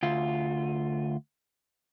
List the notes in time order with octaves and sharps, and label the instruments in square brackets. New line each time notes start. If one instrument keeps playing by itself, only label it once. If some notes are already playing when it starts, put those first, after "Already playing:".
[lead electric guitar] D2 F4